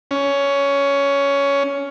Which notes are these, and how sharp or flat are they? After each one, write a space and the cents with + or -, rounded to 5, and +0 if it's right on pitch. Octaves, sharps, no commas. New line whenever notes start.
C#4 +15